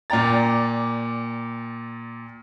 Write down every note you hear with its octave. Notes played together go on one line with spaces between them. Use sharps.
A#2 D5 G5 A#5 A6